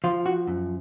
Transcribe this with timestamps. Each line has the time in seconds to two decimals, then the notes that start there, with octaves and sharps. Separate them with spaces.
0.04 F3 F4
0.26 F#4
0.47 F#2